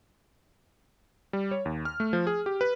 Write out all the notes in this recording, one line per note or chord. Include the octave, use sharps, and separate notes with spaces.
G3
C#5
D#2
F6
A3
F3
G#4
G4
B4